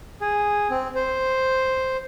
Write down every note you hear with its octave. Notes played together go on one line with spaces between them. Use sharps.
G#4
C4
C5